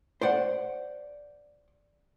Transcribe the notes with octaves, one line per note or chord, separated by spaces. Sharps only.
C5 D5 F#5